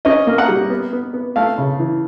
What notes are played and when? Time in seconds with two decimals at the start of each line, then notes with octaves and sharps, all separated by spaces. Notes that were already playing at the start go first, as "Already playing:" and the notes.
0.05 C#4 D#5
0.27 A#3
0.38 F#5
0.48 G3
0.70 B3
0.93 B3
1.14 B3
1.36 A3 F5
1.58 C#3
1.79 E3